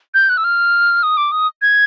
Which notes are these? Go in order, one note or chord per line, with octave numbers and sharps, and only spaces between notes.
G6
F#6
E6
F6
D#6
D6
D#6
G#6